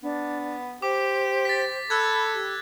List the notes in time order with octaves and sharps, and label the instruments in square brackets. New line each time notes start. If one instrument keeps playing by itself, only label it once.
[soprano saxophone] B3 [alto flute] D4
[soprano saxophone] G4 [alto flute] C5 [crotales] D6
[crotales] A6 B6
[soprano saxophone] A4 [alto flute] B5 [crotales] E6 F#6 G#6
[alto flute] G4